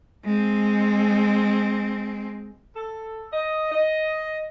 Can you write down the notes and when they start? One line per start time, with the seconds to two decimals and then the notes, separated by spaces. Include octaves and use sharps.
0.25 G#3 C4
2.76 A4
3.33 D#5
3.72 D#5